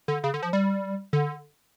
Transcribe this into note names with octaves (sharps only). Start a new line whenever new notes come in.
D3
C#3
D3
F3
G3
D3